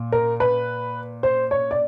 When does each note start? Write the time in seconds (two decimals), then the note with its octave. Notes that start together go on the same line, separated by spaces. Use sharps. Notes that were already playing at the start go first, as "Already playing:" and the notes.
Already playing: A#2
0.12 A#4
0.40 B4
1.23 C5
1.51 C#5
1.71 D5